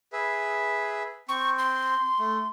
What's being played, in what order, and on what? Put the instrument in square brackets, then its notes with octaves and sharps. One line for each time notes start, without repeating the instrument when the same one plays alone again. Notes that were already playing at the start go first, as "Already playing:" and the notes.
[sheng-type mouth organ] G#4 B4 E5
[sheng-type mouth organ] C4 [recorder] C#6
[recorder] C6
[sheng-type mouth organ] A3